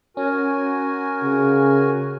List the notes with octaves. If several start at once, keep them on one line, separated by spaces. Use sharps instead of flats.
C#4 F#4 A#4 G#5
C#3